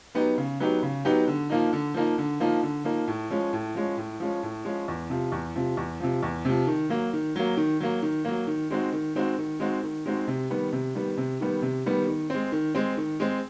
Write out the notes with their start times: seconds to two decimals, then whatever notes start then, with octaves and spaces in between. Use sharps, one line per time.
0.15 F#3 B3 D#4 G4
0.38 C#3
0.60 F#3 B3 D#4 G4
0.83 C#3
1.05 F#3 B3 D#4 G4
1.28 D3
1.50 F3 A#3 D#4
1.73 D3
1.94 F3 A#3 D#4
2.18 D3
2.40 F3 A#3 D#4
2.63 D3
2.84 F3 A#3 D#4
3.07 A2
3.30 F3 G#3 C#4
3.53 A2
3.75 F3 G#3 C#4
3.97 A2
4.20 F3 G#3 C#4
4.43 A2
4.65 F3 G#3 C#4
4.88 E2
5.10 C3 F3
5.32 E2
5.56 C3 F3
5.77 E2
6.00 C3 F3
6.23 E2
6.45 C3 F3
6.67 D#3
6.89 F#3 A#3
7.13 D#3
7.36 F#3 A#3
7.57 D#3
7.80 F#3 A#3
8.02 D#3
8.25 F#3 A#3
8.47 D#3
8.70 G#3 C4 D#4 F#4
8.92 D#3
9.15 G#3 C4 D#4 F#4
9.38 D#3
9.60 G#3 C4 D#4 F#4
9.83 D#3
10.06 G#3 C4 D#4 F#4
10.28 C3
10.50 D#3 G3 B3
10.72 C3
10.95 D#3 G3 B3
11.17 C3
11.40 D#3 G3 B3
11.62 C3
11.86 D#3 G3 B3
12.07 D#3
12.30 G#3 C4
12.52 D#3
12.75 G#3 C4
12.97 D#3
13.20 G#3 C4